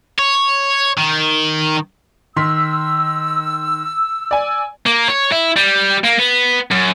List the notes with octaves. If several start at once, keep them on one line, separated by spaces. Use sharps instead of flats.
C#5
D#3
D#3 C6 E6 B6
D5 G#5
A#3
C#5
E4
G3
A#3
B3
F#2